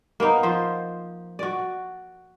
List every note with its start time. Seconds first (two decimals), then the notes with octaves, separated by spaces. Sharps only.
0.20 A#3 B3 D#4
0.43 F3 C5
1.39 F#4 D5